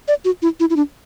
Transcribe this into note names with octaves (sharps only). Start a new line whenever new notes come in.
D5
F#4
E4
E4
E4
D4